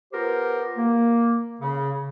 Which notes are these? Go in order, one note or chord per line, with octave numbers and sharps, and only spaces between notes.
B3 F4 G4 A#4 C5
A#3
C#3